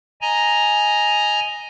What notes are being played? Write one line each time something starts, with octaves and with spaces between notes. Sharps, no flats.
D#5 G#5 A#5